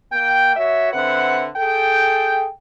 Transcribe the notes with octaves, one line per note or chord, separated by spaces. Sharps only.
A#3 G5
F#4 C#5 E5
D3 C4 B4 E5 F#5
G#4 A4 G5